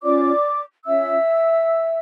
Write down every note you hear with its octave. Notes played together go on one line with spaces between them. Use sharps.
C#4 F4 C#5 D5 D6
C#4 F4 C#5 E5 E6